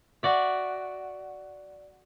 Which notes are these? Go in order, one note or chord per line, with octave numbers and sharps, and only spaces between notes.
F#4 D5 E5